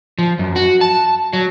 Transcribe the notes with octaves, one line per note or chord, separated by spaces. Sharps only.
F3
F#2
F#4
A5
F#3